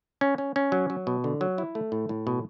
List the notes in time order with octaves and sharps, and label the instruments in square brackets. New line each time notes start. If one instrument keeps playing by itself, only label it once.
[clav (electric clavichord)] C#4
C#4
C#4
F#3
F#3
B2
D3
F#3
E4
A3
A2
A2
B2